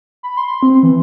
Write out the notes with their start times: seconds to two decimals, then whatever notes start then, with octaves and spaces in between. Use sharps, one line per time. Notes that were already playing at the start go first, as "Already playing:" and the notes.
0.23 B5
0.37 C6
0.63 C4
0.83 E3